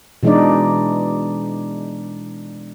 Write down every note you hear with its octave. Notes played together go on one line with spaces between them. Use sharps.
B2 E3 G#3 D4 D#4 D5